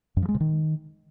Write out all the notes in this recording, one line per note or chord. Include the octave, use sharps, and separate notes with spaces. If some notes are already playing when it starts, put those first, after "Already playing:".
F#2
F3
G#3
C3
D#3